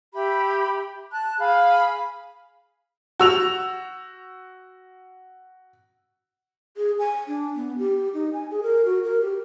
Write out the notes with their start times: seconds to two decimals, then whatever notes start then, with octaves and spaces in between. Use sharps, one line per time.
0.14 G4 E5 B5
1.12 A5 F#6
1.39 G#4 F5 B5
3.20 F#4 E6 F7
6.77 G#4
6.99 G#5
7.27 D4
7.56 B3
7.78 G4
8.14 D#4
8.33 G#5
8.51 G#4
8.63 A#4
8.85 F#4
9.04 A#4
9.21 G4